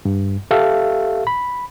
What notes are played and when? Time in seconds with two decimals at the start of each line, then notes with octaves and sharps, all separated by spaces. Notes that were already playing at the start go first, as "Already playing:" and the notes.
0.05 G2
0.51 G4 A4 E5 F5
1.27 B5